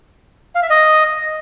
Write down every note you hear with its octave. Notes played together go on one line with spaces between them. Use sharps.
F5
E5
D#5